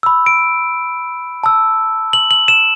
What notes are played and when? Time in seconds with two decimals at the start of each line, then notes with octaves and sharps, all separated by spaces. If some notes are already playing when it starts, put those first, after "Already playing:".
0.03 B5 E6
0.26 D7
1.44 A5 E6
2.13 F#7
2.31 F#7
2.48 E7